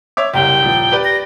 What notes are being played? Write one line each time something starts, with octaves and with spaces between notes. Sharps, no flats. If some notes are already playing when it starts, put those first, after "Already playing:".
C#5 E5 D6
F#1 C2 G4 G5
D#1 F3
G4 B4 D5
A#6